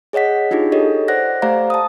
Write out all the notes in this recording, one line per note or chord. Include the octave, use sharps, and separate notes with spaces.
G#4 C#5 D#5 F#5 B6
D4 D#4 F4 G4 G#4
G4 A4 C#5 D#5
C5 D5 F#5 F#6 A#6
A3 G4 C5 D5 F5 A#5
A5 D#6